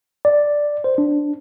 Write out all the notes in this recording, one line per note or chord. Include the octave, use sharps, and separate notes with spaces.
D5
C5
D4